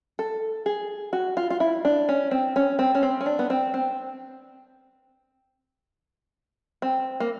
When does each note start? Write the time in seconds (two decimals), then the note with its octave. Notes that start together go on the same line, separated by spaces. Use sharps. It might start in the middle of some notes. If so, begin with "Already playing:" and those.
0.19 A4
0.66 G#4
1.13 F#4
1.37 F4
1.50 F4
1.60 E4
1.85 D4
2.09 C#4
2.31 C4
2.56 C#4
2.79 C4
2.95 C#4
3.03 C4
3.21 C#4
3.26 D4
3.39 B3
3.50 C4
3.74 C4
6.82 C4
7.20 A#3